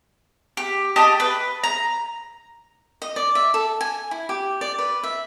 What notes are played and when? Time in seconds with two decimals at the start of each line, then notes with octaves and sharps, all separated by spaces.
0.57 G4
0.96 G4 D#5 A5
1.20 B4
1.64 A#5
3.02 D#5
3.16 D5
3.35 E5
3.54 A4
3.81 G#5
4.11 E4
4.29 G4
4.61 D5
4.78 B4
5.03 E5